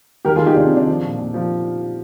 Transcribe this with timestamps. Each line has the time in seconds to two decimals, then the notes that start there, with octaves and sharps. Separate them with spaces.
0.25 D#3 G4 A#4
0.36 F4 G#4
0.40 D#3
0.46 D#4 G4
0.56 C3 D4 F4
0.66 C4 D#4
0.73 D#3 D4
0.88 F3
1.04 A#2
1.19 A#2
1.34 F3